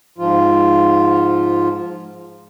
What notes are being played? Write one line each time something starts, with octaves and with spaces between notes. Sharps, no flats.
G#2 F3 F4